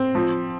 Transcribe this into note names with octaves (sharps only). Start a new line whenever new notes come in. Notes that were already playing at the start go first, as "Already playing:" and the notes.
Already playing: C4
F3